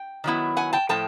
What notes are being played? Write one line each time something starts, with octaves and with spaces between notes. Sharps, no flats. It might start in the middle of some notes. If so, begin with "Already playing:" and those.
Already playing: G5
D#3 F#3 B3 E4
F#5 G#5
G5 A5
A2 F3 A3 G5 A5